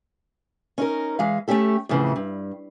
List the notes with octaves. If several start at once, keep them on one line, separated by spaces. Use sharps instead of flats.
C#4 D#4 A#4
E3 G#3 F5
A3 A#3 C#4 G4 A4
F2 A2 C#3 E3
G2